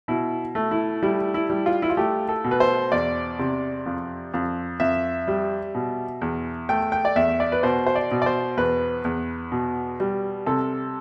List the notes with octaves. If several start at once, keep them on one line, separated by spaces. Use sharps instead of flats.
B2 E4
A3
E4
G3 E4
E4
G3
F4
E4
F4
A3 G4
A4
B2
B4
C5
E2 D5
C3
F2
F2
F2 E5
G3
B2
E2
A3 G5
G5
D5
E2 E5
D5
B4
B2 C5
C5
D5
B2
D5
C5
E2 B4
E2
B2
G3
C3 A4